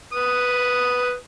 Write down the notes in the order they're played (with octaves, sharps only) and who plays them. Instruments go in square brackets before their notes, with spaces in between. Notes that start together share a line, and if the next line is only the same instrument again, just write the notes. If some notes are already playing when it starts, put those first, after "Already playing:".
[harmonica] B4 D#6